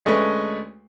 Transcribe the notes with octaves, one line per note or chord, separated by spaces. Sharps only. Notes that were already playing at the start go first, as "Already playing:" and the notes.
D2 G#3 A3 C#4 B4 C#6